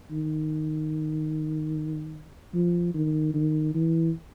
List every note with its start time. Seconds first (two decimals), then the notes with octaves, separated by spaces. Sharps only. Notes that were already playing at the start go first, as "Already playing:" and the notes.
0.12 D#3
2.54 F3
2.94 D#3
3.34 D#3
3.74 E3